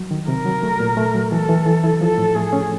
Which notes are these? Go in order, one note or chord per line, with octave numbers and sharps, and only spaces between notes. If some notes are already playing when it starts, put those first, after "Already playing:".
Already playing: F#3
D#3
C3 A#4
F#3
A3
A#2
A3
F#3
E3 A4
E3
E3
E4
F3 A4
A2
A3 G#4
C#4